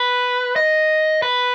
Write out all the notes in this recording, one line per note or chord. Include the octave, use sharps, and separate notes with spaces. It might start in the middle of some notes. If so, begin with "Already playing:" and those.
Already playing: B4
D#5
B4